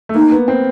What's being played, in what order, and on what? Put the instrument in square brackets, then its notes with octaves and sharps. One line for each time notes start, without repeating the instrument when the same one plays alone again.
[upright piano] A3
[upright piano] A#3 [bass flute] D#4
[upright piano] B3
C4